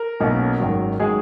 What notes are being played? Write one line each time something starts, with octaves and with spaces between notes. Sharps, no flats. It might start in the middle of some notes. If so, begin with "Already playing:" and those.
Already playing: A#4
B1 B2 A#3 C#4
G#1 F#2 D#3 F#3
D#3 F#3 G#3 G#4